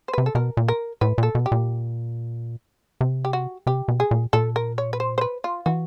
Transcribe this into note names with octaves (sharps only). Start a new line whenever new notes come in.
C5
C3 B4
A4
B2 A#4
A#2
A#4
A2 B4
A#2 A4
B2
G4
A#2
C3
G4
F#4
C3 G4
B2
G#4
A#2
A#2 A4
A#4
C#5
B4
C5
C5
B4
F4
E3 F#4